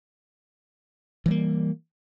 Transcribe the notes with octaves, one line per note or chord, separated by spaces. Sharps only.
E3 G3 A#3